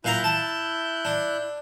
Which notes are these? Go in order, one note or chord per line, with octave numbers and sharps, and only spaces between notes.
A#2 E4 F5 A#5 F#6 G6
A5
D4